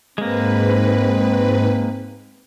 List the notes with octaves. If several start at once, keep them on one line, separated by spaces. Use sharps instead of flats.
G#2 G#3 A#3 C4 B4